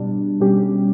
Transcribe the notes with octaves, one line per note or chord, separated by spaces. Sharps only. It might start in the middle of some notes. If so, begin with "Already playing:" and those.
Already playing: B2 G3 D4
B2 G3 C#4 G4